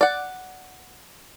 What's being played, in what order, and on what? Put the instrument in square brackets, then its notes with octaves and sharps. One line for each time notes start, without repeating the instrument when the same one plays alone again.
[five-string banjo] D5 F#5